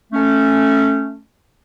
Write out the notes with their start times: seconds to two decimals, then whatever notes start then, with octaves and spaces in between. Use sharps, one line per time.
0.13 A3 C#4